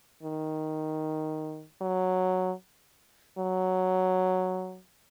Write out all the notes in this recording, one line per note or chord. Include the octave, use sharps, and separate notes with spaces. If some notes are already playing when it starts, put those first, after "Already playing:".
D#3
F#3
F#3